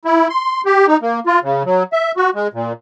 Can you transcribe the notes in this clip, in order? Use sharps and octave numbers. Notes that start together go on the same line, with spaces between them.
E4
C6
G4
D#4
A#3
F4
C#3
F#3
E5
F#4
G#3
A#2